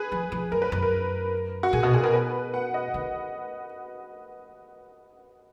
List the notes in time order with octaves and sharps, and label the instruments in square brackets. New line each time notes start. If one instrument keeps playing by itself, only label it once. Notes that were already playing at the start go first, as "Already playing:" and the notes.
Already playing: [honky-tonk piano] G#4 B4
[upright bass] F3
F3
[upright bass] F#2 [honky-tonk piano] A#4
[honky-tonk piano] B4
[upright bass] F#2
[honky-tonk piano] A#4
F#4
[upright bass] A#2 [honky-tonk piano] G#4
[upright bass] B2 [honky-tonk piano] F#4
[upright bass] A#2 [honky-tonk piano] G#4
[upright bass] B2 [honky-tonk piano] A#4
[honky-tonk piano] B4
F#5
D#5
[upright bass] D3